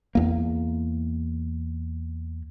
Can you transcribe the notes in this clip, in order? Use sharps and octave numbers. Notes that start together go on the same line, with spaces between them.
E2 A#3